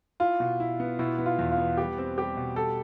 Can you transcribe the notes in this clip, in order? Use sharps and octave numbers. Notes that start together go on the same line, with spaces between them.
E4 F4
B2
E4
B3
B2 E4
B3
F4
E2
F4
B3
G3 G4
C4
G3 G4
B2
G3 A4